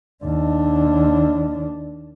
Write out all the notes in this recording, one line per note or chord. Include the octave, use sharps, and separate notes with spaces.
D#2 D4